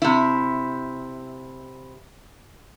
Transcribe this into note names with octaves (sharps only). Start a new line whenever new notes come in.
C3 E4